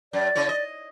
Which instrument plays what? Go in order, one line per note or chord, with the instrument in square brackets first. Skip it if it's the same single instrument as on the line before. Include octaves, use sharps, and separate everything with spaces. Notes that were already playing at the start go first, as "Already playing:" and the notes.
[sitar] F#2 [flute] D5
[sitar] C#3 E4 C#5
D#5